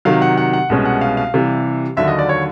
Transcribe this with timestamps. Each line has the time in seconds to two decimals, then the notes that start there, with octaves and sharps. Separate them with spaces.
0.05 C3 D#3 F#3 F5
0.22 F#5
0.38 F#5
0.53 F#5
0.70 C2 B2 G#3 C#4
0.85 F#5
1.01 F5
1.17 F5
1.34 C3 E3 G3
1.97 D#2 D3 F#3 E5
2.08 D#5
2.19 D5
2.29 C#5